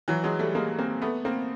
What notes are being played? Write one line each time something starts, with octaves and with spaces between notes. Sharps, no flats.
E3 F#3
F#3 G#3
G3 A3
G#3 A#3
A#3 C4
A3 B3
A#3 C4